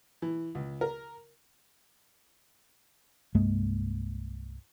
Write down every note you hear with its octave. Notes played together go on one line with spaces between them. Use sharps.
E3
C#2
A#4
C2 G2 G#3 A#3